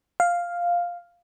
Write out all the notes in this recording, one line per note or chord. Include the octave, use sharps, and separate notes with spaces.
F5